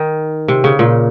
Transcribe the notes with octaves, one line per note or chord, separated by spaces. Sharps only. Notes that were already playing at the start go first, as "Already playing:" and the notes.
Already playing: D#3
C3
C#3
A#2